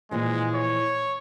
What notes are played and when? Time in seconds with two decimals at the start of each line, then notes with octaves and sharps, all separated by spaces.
0.11 A#2 E3 F3 G#3
0.54 C#5